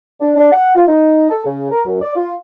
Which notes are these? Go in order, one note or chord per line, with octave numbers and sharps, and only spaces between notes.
D4
D4
F#5
F4
D#4
A4
C#3
A#4
F#2
D5
F4